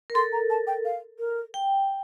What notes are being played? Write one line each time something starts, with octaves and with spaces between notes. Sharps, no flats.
A#4
A4 C6
A#5
A5
G5
F5
A#4
G5